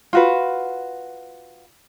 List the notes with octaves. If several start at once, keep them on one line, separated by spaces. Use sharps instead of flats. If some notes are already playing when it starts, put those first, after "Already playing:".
F4 F#4 B4